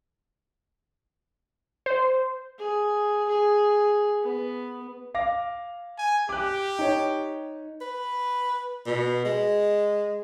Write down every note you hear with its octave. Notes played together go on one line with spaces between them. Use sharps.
C5
G#4
G#4
B3
F5 D6 A#6
G#5
G4 D6 F#6
D#4 C#5
B4
B2
G#3